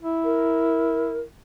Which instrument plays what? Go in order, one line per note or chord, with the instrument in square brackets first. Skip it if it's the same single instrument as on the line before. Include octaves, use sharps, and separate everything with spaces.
[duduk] E4
[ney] A#4